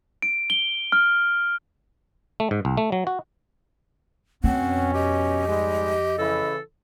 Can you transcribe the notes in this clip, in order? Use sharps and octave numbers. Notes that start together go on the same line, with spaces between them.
D7
G7
F6
A3
G#2
C2
A3
F#3
F#4
F2 B2 C4 C#4 F#5
G4 D#5
G#2 G3 G#3
C#3 E3 E4 A4